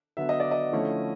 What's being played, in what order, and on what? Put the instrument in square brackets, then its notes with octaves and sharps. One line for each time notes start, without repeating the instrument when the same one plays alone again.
[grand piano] D3 F#3 B3 E5
D#5
D5
D#5
D3 F3 A3 C#4 E4